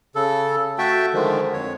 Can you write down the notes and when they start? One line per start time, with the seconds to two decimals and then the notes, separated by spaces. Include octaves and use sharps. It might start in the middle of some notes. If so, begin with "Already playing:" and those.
0.15 C#3 A4
0.78 A3 F#4 E5 G5 A5
1.13 D3 D#3 F3 G#3
1.54 F2 C#5